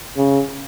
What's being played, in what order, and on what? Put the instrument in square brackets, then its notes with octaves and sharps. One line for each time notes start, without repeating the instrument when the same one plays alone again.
[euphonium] C#3